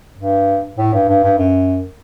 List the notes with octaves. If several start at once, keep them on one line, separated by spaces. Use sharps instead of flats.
G2
A2
G2
G2
G2
F#2